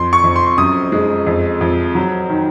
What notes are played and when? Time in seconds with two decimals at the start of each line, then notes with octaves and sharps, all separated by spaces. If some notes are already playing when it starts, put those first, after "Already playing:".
Already playing: F2 C6
0.13 C#6
0.23 F2
0.36 C6
0.58 F#2 D#6
0.92 G#3
1.26 F2
1.61 F2
1.95 F#3
2.29 D#3